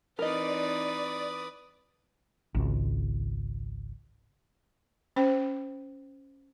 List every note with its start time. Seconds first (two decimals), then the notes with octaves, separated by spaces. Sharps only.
0.19 E3 C4 D#4 A#4 B4 D5 D#5 D#6
2.55 G#1 C#2
5.16 C#4 C5 G5